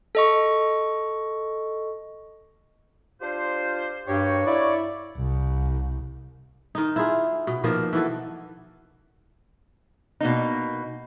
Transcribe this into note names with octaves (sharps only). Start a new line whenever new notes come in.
A4 D#5 C#6
D4 F4 G4 C5
G2 A#3 F#4 G4 C#5
E4 D5
C2
D#3 D#4
E4 F4 G#4
B2
B2 D#3 F3 A#3
E3 F#4 A4
B2 A#3 D#4